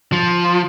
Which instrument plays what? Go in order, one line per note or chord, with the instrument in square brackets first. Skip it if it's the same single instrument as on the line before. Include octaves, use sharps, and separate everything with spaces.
[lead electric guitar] F3